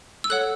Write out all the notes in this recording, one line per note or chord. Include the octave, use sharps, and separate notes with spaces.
E6
A4 C#5 F#5 F#6